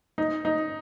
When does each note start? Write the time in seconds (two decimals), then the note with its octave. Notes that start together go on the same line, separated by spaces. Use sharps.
0.18 D#4
0.45 D#4